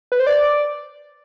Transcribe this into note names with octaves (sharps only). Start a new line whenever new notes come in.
B4
C5
D5